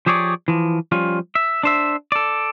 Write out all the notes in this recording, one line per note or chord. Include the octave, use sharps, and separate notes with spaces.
F3 G4 G#4 C#5 D5
E3 F3
F3 G3 C#4 F4
E5
D4 C5 E5
A4 D5